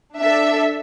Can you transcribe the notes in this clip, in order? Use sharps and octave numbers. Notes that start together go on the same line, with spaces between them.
D4 A4 E5